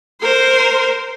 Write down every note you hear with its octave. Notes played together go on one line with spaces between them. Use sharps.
A#4 C5